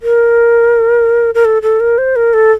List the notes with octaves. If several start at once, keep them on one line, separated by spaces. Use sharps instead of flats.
A#4
A#4
A4
A4
A#4
C5
A#4
A4